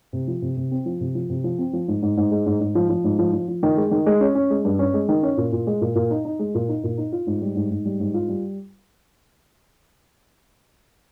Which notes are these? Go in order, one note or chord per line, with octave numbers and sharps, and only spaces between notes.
C3
F3
C3
C3
C4
F3
C3
F3
C3
F3
C4
F3
G#2
G#2
G#2
G#3
G#2
G#2
F3
F3
G#2
F3
F3
F3
D#3
G#3
D#3
G#3
C#4
C#4
G#3
G2
C#4
G#3
D#3
C#4
A#2
A#2
G#3
A#2
A#2
D#4
D#4
G#3
A#2
D#4
A#2
D#4
F4
G#2
G3
G#2
G#2
G3
G#2
F4
G3